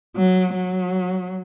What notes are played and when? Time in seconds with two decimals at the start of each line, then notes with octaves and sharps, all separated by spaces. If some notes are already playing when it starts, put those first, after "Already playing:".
0.17 F#3
0.53 F#3